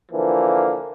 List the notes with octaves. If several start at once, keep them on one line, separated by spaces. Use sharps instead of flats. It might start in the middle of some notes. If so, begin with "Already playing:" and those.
D3 E3 F3 A#3